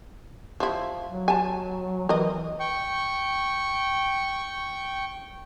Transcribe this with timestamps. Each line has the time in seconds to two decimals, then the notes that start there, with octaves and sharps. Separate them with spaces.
0.60 F3 E4
1.09 F#3
1.28 G#5 A5
2.09 E3 A#4 D#5
2.60 G5 C#6